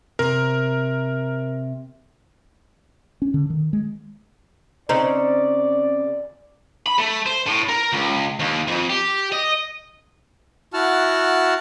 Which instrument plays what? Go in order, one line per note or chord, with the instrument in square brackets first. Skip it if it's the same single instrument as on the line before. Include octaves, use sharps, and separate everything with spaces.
[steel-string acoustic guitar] C3 [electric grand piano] A#4
[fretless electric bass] C#4
D3
D#3
G#3
[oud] C#3 C4 D#4 [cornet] D5
[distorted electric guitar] B5
A3
C5
A2
A#4
C#2
D#2
F2
G4
D#5
[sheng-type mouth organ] E4 F#4 F#5 A5 F6